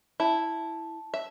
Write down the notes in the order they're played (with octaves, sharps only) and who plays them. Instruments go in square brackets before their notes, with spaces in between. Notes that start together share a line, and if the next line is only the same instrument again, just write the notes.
[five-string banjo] E4 [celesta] A5
[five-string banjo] E5